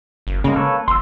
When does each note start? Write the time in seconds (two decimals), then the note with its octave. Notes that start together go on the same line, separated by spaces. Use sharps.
0.27 F#1
0.44 C#3 G#3 A#3
0.56 A4 B4 C#5
0.88 F1 C6 E6